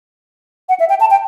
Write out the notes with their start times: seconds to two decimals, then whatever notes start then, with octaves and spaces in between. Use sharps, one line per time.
0.69 F#5
0.80 E5
0.89 G5
1.00 A5
1.11 G5